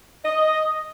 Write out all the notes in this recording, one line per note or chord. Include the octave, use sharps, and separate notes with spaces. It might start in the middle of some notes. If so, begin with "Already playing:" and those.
D#5